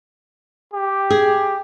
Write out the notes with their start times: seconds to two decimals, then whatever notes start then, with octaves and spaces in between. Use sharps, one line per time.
0.74 G4
1.10 G#4